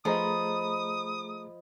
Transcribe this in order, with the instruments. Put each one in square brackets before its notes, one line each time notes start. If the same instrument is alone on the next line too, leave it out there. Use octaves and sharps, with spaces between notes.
[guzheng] F3 [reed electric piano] A3 G#4 A#5 [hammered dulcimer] D#5 B5 [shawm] D#6